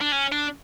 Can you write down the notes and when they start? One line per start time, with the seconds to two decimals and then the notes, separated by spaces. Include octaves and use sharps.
0.01 D4
0.12 C#4
0.32 D4